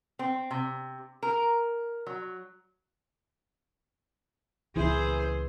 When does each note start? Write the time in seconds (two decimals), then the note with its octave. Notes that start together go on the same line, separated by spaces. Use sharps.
0.19 C4
0.51 C3
1.23 A#4
2.07 F#3
4.76 C#2 A#2 E3 E4 G#4 C5